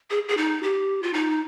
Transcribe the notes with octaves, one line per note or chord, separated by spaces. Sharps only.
G#4
G#4
D#4
G4
F4
D#4